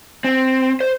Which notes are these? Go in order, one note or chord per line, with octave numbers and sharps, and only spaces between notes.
C4
C5